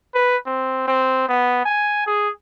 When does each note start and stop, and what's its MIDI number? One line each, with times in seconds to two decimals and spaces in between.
0.15 0.37 71
0.46 0.85 60
0.88 1.29 60
1.29 1.63 59
1.66 2.03 80
2.07 2.29 68